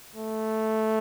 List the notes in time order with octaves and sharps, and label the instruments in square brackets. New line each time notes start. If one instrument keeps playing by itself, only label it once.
[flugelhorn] A3